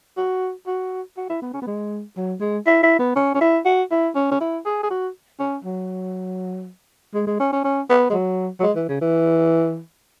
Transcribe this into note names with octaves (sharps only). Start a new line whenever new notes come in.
F#4
F#4
F#4
E4
B3
C#4
B3
G#3
F#3
G#3
E4
E4
B3
C#4
C#4
E4
F#4
E4
C#4
C#4
E4
G#4
G#4
F#4
C#4
F#3
G#3
G#3
C#4
C#4
C#4
B3
G#3
F#3
F#3
G#3
E3
C#3
E3